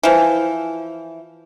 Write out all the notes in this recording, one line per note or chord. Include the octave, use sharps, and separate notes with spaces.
E3 F3